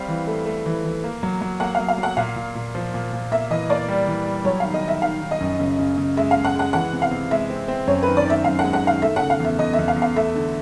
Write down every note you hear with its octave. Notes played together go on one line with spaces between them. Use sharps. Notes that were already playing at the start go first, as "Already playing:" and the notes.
Already playing: G3 C4 F5
E3
A3
A3
E3
E3
A#3
F#3
F#3
A#3 F#5
F#3 F5
F5
F#3
F#5
A#2 F5
A#2
A#2
F3
A#2
A#2
A#3 E5
E3 D#5
A#3 D5
G3
E3
G3
F#3 C#5
D#3 F5
D#5
D#3 E5
D#3 F5
D#3
D#5
F#2
C#3
C#3
C#3
G#3 E5
F5
G#3
F#5
G#3 F#5
E3 F#5
C3
F5
C3
G#3 E5
C4
C4
F#2 C#5
D#3 B4
D5
D#3 E5
F#2 F5
F#5
G#3
F#5
D#3 F5
A3 E5
C#3 F#5
F5
E2 E5
E2 D#5
E5
E2
F5
E2
F5
A3 E5
D3